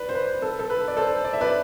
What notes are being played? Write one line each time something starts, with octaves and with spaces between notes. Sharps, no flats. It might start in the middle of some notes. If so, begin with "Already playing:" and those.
Already playing: B4 D5
C5
B4
A4
A4
B4
D5
A4 C5
D5
E5
B4 D5